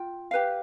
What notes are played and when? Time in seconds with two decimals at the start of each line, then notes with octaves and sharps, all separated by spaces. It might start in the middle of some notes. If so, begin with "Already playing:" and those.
Already playing: F4 G5
0.31 G4 B4 F5